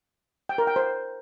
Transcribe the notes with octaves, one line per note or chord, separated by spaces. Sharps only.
G5
A#4
G5
C5